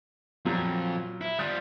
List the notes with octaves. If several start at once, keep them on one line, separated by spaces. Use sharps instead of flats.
F2 A#2 F#3 G3
E4
G3 F4 D#6 F#6 A6